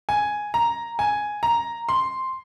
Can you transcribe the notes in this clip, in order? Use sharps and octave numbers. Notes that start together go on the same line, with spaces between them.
G#5
A#5
G#5
A#5
C6